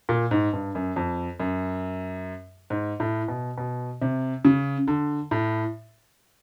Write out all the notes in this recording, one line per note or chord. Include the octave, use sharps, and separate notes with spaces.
A#2
G#2
G2
F#2
F2
F#2
G#2
A2
B2
B2
C3
C#3
D3
A2